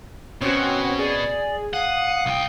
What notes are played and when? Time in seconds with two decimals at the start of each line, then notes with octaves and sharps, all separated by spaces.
0.41 B2 C4 C#4 F#4 C#5
0.98 G#4 D5
1.73 F5 F#5 D#6
2.26 C2 G5